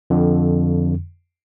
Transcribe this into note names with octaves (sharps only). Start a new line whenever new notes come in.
F2 D3